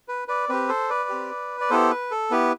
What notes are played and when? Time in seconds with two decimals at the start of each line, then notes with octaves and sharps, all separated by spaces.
0.08 B4
0.28 B4 D5
0.49 C4 G4 B4
0.69 A4 C5
0.89 B4 D5
1.09 C4 G4
1.61 D5
1.70 B3 E4 G4 A4 C5
1.91 B4
2.11 A4
2.31 B3 E4 G4 B4